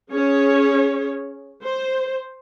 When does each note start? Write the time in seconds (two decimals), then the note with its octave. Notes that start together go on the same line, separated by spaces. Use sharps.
0.12 C#4 G#4 C#5
1.63 C5